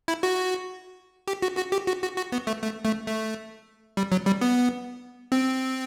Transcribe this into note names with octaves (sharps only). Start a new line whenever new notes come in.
E4
F#4
G4
F#4
F#4
G4
F#4
F#4
F#4
B3
A3
A3
A3
A3
G3
F#3
G3
B3
C4